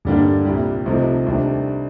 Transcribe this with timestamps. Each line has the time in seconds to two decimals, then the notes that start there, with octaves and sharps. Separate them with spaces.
0.05 G2 D3 G3 A#3 D4
0.45 C2 A#2 G3
0.86 C2 C3 F3 A3 D#4
1.26 C2 C3 D#3 A3 D4